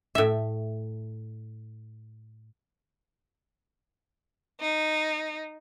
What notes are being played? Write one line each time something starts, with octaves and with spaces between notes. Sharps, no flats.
A2 E5
D#4